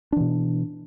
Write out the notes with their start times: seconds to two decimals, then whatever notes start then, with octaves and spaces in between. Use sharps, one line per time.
0.12 D4
0.16 E3
0.20 B2